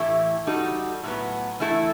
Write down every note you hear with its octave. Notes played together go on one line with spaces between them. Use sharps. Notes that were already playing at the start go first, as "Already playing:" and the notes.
Already playing: A2 E3 A3 E4 G4
G3 D#4 F#4 A4
A2 F#3 B3
E3 A3 E4 A4